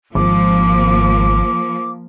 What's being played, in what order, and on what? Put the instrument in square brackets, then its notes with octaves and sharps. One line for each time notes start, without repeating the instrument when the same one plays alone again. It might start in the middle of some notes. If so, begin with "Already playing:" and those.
[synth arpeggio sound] G#1 [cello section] F3 A#3 [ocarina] D6